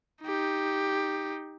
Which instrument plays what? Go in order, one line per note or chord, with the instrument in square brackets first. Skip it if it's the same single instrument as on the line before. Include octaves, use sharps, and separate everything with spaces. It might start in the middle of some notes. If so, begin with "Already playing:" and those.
[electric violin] D#4 G4